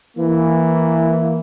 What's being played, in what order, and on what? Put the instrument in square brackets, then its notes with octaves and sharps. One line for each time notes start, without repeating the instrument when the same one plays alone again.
[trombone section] E3 A#3